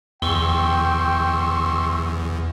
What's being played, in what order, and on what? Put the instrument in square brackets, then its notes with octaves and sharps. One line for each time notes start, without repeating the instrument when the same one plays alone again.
[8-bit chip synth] E2 [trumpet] G5 [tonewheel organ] C6 C#6 E6